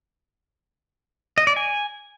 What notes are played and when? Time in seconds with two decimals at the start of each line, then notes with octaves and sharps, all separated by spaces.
1.38 D#5
1.47 D5
1.56 G#5